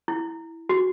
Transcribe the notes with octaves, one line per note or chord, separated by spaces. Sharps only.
E4
F#4